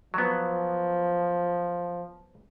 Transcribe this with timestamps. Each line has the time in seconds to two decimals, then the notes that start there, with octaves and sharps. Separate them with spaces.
0.14 F3 F#3 B3